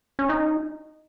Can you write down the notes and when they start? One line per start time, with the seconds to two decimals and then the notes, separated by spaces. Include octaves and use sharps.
0.19 C#4
0.29 D#4